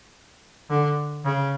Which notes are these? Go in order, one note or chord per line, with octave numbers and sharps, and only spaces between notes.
D3
C#3